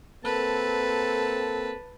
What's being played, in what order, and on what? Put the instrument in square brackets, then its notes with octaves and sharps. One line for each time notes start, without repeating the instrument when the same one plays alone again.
[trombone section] A#3 C4 A4 [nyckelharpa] B4 A5